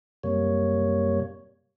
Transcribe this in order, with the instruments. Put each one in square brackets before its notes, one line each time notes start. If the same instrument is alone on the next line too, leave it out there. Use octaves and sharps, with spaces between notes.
[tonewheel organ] F#2 C3 G3 A#3 C#5